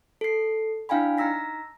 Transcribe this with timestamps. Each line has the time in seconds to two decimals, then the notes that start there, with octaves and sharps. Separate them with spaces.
0.21 A4 C7
0.89 D4 E4 F5 G5 G#5 B5
1.18 D#4 A#5 E6 A#6 B6